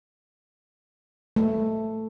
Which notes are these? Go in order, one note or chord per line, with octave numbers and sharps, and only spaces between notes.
A3